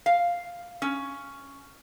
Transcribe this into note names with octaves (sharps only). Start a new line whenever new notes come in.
F5
C#4